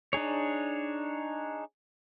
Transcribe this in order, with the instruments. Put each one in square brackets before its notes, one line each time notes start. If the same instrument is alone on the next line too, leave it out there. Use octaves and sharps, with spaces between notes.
[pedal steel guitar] D4 D#4 G#4 C#5